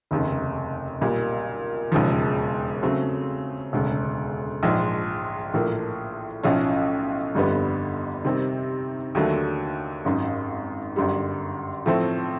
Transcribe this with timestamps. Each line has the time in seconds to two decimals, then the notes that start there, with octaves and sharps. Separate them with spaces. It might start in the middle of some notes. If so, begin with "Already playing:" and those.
0.11 F1 D#2 C#3
1.01 B1 A#2 G3
1.92 E1 D#2 C#3 F3
2.83 C#3 F#3 A3 C4
3.73 E1 D2 C#3
4.63 A#1 G#2 F3 G#3
5.54 A#1 A2 F3 A#3
6.43 B1 A2 F3 A3 C#4
7.35 G1 F2 D3 G3 B3
8.25 C3 D#3 G3 C4
9.15 D#2 D3 F#3 A3
10.05 G#1 F#2 D#3
10.96 G1 F#2 D3 G3
11.86 A2 F3 A3 C4